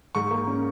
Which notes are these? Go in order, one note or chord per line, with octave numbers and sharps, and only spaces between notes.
G#2 C#6
A#3
C#4